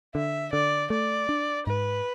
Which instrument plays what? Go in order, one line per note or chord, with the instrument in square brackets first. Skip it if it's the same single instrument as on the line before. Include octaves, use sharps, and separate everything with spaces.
[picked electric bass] D3 [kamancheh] E5
[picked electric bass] D3 [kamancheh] D5
[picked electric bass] A3 [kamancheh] D5
[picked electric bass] D4
[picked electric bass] G#2 [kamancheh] B4